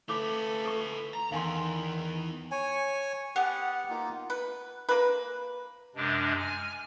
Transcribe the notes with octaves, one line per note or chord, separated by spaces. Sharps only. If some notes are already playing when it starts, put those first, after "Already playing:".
A3 F4 B4 D6
A4 C#6
A#5
E2 D#3 F5 G#5 C6
C#5 G#5
B3 G4 F#5
A#3 D#4 F4
B4
A#3 B4
F#2 C3 G#3 D4
G#5 F6